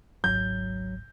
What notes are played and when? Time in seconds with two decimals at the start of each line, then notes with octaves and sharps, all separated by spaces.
0.24 G#1 C#2 F#3 G6